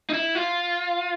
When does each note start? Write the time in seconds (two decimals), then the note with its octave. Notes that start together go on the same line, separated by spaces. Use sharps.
0.09 D#4
0.13 E4
0.35 F4